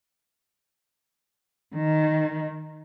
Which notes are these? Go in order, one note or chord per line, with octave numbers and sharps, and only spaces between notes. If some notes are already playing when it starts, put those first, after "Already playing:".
D#3